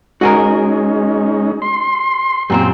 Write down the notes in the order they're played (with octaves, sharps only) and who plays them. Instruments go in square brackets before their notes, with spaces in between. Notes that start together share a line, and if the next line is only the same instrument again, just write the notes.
[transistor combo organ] G#3 C#4 D#4 [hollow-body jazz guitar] F#4 G#4 A#4
[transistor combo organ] C6
[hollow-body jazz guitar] F#2 A#2 C4 [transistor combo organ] G4